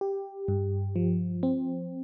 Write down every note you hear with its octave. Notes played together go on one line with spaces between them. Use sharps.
G4
G2
F3
C4